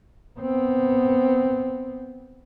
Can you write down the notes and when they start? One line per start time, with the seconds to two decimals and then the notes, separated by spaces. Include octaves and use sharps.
0.39 B3 C4